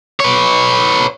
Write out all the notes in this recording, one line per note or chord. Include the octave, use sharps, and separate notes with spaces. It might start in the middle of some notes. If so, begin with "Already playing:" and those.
B4 C#5